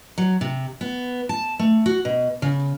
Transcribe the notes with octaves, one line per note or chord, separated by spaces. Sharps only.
F#3
C3
B3
A5
A3
F#4
B2
C#3